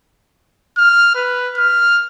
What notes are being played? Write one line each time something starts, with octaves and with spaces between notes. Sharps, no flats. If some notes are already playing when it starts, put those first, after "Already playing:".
F6
B4
F6